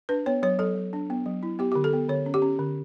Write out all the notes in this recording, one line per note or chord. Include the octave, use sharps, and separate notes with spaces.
D4 B4
B3 C#5
F#3 C#5
F#3 A4
F#3
D4
B3
F#3
E4
B3 G4
D3 G4
A4
B3
D3 C#5
C#4
G4
C#4
D3